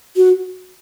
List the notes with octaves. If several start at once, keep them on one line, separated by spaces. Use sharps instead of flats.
F#4